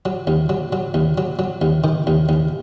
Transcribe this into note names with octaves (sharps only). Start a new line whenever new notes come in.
F#3
D#2
F#3
F#3
D#2
F#3
F#3
D#2
D#3
D#2
D#2